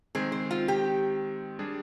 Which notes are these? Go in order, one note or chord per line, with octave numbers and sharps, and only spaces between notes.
D#3 G#3 C4 G#4
C5
F4
G4
G3 D4 G#4